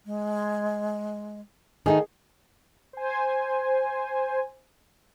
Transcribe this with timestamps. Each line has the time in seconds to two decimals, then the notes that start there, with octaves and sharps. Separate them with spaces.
0.06 G#3
1.86 D#3 A3 D#4 G#4
2.93 C5 G#5